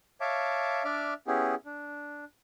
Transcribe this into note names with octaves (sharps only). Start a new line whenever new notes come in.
C#5 E5 F5 A5 D6
D4 D5 E5 D6 F6
B3 C#4 E4 G4 G#4
D4